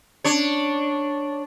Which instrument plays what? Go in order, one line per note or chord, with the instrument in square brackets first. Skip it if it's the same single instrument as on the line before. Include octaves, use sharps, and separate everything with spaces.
[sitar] D4 C#5